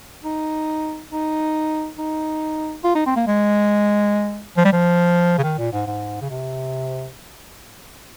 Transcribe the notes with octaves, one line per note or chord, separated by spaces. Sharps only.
D#4
D#4
D#4
F4
D#4
C4
A#3
G#3
F3
G3
F3
C#3
D#3
A#2
G#2
G#2
C#3
C3